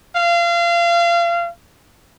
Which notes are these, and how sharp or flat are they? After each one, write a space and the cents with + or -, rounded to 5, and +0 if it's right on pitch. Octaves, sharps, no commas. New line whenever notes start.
F5 -30